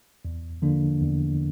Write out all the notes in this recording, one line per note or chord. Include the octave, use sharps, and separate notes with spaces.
E2
D3 F3 A#3 D4
E2